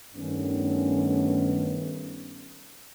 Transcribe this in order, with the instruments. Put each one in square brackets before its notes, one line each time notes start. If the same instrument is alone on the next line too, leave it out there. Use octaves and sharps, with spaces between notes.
[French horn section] G2 D#3 A3 B3 C#4